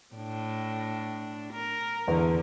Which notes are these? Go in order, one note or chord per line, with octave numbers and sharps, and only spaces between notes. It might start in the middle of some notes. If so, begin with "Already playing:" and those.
A2 D4
A#4
E2 D3